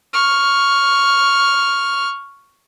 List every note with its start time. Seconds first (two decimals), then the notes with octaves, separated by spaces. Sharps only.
0.13 C#6 F6